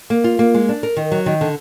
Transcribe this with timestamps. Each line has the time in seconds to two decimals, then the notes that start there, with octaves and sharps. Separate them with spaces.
0.10 A#3
0.24 F4
0.39 A#3
0.54 G#3
0.69 D4
0.83 A#4
0.97 D#3
1.11 F#3
1.26 D#3
1.41 D3